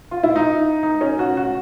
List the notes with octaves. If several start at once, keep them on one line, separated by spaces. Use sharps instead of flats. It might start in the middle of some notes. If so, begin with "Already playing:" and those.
F4
E4
D#4
D#4
C#4
F#4
F#4